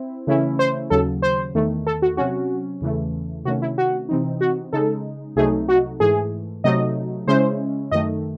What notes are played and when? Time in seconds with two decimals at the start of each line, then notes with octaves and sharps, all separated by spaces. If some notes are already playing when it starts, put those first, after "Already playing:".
Already playing: C4 E4
0.27 C#3 E3 A3 C#4 E4
0.59 C5
0.90 D#2 C#3 F#3 A4
1.22 C5
1.55 E2 D#3 A3
1.87 A4
2.02 F#4
2.17 C3 F#3 C#4 F#4
2.81 E2 C#3 E3 A3
3.45 C3 D#3 A3 C#4 F#4
3.62 E4
3.78 F#4
4.09 C3 E3 C4 D#4
4.41 F#4
4.73 C#3 G#3 D#4 A4
5.36 C2 C3 F#3 A3 D#4 G#4
5.68 F#4
6.00 G#2 E3 A3 G#4
6.64 C3 F#3 A3 D#4 D#5
7.27 C#3 G#3 C#4 E4 C5
7.91 F#2 D#3 A3 D#5